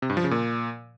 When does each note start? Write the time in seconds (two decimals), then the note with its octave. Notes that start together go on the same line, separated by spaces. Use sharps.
0.02 C3
0.10 G2
0.17 F3
0.24 C#3
0.31 A#2